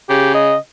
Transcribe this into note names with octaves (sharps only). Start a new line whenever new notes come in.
C#3 G4
D#5